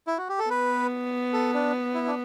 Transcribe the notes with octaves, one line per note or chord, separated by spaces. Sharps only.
E4
F#4
G4
A4
B3 B4
A4
D4
E4
D4